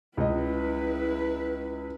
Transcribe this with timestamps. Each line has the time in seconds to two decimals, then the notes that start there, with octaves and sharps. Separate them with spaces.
0.17 C#2 E4 B4 D#5